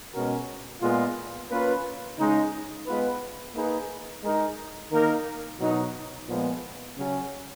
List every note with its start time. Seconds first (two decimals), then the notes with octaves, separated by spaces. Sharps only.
0.14 B2 G#3 C#4 F#4 A#4
0.81 A#2 G#3 B3 F4
1.50 A#3 C#4 F4 B4
2.18 C#3 G#3 D#4
2.87 G#3 B3 F4 B4
3.55 A#3 D#4 G#4 B4
4.23 G#3 D#4 A#4
4.91 D#3 A#3 D#4 A#4
5.60 B2 F#3 B3 D#4
6.28 A#2 F3 G#3 B3
6.96 C#3 F#3 C#4